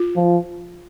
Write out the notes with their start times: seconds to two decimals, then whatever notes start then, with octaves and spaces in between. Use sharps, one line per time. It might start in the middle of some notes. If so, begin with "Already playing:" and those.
Already playing: F4
0.16 F3